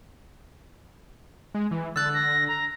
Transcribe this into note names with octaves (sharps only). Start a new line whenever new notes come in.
G#3
E3
D3 E6 F#6 A6
A#6
A#5